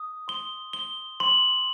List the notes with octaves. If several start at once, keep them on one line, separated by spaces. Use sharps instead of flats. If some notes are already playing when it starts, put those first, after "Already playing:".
Already playing: D#6
C6 G7
C6 G7
C6 F#7